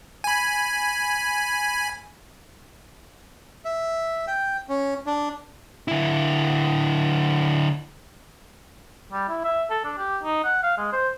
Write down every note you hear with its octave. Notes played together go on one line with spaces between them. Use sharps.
G#5 B5
E5
G5
C#4
D4
D3 E4
G3
E4
E5
A4
D4
G4
D#4
F#5
F5
G#3
C5